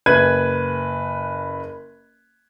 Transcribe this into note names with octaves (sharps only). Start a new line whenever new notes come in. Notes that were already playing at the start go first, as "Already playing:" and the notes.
F#1 B4 F#6 G#6 D#7